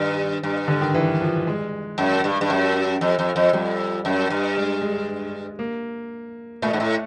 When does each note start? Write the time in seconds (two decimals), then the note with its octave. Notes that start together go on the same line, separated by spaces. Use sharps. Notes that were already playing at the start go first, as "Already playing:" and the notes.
Already playing: G2 D#3
0.43 G2
0.68 D3
0.81 D#3
0.94 E3
1.21 F3
1.47 G#3
1.98 F#2
2.24 G2
2.41 G2
2.50 F#2
3.01 F2
3.19 F2
3.36 F2
3.53 F2 G3
4.05 F#2
4.30 G2
4.57 G#3
4.82 G#3
5.59 A#3
6.62 A#2 A3
6.73 G#2
6.80 A2